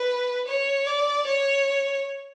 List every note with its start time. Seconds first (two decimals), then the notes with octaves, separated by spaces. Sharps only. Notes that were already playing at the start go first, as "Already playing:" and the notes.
Already playing: B4
0.48 C#5
0.87 D5
1.27 C#5